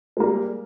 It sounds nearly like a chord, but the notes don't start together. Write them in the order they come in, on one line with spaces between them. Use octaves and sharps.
G#3 A#3 G3